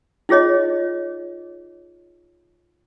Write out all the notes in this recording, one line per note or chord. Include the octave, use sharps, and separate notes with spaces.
D#4 F4 G#4 C#5 D#5